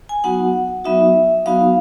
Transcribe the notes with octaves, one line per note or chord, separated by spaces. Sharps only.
G#5
F#3 B3 D#4 F#4 F#5
F#3 B3 D#4 F#4 E5
F#3 B3 D#4 F#4 F5